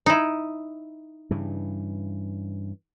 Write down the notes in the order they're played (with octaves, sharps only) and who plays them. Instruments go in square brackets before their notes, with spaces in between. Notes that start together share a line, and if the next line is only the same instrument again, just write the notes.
[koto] D#4 E4
[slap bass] G2 C#3 E3